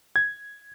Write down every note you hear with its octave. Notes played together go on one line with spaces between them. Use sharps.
G#6